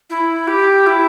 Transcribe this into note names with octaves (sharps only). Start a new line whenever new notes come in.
E4
G4
E4